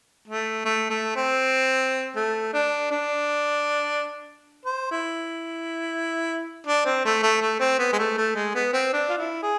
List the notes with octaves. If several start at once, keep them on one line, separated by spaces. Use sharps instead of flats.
A3
A3
A3
C4
A3
D4
D4
C5
E4
D4
C4
A3
A3
A3
C4
B3
G#3
A3
A3
G#3
B3
C4
D4
F4
E4
G#4